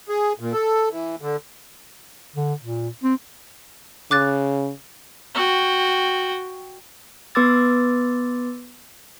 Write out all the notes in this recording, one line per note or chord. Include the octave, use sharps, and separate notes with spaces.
G#4
A#2
A4
E3
D3
D3
A#2
C4
C#3 D6 F#6 A6
F#4 G5
B3 B4 C6 D6 E6 A6